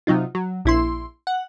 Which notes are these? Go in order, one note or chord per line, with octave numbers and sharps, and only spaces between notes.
C3 F#3 D#4 F4
F#3
A#1 E4 C6
F#5